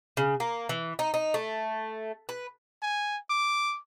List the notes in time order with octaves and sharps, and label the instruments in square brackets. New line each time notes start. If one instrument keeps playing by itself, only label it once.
[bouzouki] C#3
A#3
E3
D#4
D#4
A3
B4
[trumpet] G#5
D6